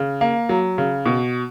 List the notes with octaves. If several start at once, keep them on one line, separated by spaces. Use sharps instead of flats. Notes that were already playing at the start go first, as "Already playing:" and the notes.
Already playing: C#3
A#3
F#3
C#3
B2